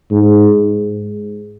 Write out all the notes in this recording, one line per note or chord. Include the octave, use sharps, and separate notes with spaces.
G#2